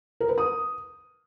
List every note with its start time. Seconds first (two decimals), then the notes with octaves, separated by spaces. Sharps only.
0.20 A#4
0.29 B4
0.38 D#6